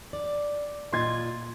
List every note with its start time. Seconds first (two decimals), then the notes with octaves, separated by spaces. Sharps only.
0.13 D5
0.92 A#2 F4 D#5 C6 G#6 A6